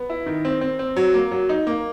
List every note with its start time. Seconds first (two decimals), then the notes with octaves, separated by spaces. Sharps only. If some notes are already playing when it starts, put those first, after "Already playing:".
Already playing: B3
0.10 E4
0.26 D#3
0.45 C4
0.61 C4
0.79 C4
0.96 F#3
1.14 A#3
1.31 F#3
1.49 D#4
1.67 A#3